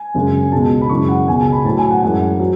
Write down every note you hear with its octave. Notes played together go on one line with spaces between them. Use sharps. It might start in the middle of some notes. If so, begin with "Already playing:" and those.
Already playing: G#5
F#2 C#3 G#3
C#2 B2 G#3 A5
B5
F#2 C#3 E3 G#3 C#6
F#5
C#2 B2 G#3 G#5
A5
B5
A2 F#3 A5
G#5
F#5
F#2 E3 G#3 F#5
F#3